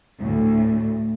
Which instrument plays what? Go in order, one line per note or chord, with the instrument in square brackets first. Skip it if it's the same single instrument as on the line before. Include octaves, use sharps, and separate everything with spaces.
[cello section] D2 A2